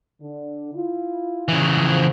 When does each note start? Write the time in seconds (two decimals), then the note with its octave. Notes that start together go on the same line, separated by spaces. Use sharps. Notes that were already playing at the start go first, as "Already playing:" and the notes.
0.21 D3 D4
0.74 E4 F4
1.48 C#3 E3
1.78 F3